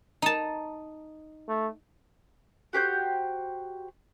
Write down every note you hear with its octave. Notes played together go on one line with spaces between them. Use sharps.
D#4 A5
A3
F#4 G4 C5 G6